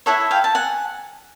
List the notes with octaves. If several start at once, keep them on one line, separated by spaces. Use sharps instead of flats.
E4 A4 C#5 E5 F#5
F5 G5
A5
F#5 G#5